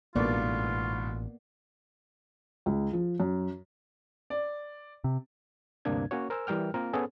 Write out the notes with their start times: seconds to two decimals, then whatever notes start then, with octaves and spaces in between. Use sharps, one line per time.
0.15 A1 G#2 B2 D3 A#3 B3 F4 D5
2.66 C#2
2.93 F3
3.20 F#2
4.30 D5
5.04 C3
5.85 D2 G2 C3 A#3 D4 G#6
6.11 A#3 C#4 F#4 C#5
6.30 A#4 C5 G#5 E6
6.47 E3 G3 A#4 G5 F6
6.74 A#3 C4 F4 A#4
6.93 B3 C#4 G#4 A4 C5